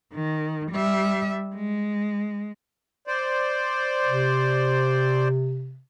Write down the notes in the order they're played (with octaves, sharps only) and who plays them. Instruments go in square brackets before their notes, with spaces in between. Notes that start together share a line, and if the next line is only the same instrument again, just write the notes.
[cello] D#3
G3 E5
G#3
[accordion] C5 D5
[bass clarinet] C3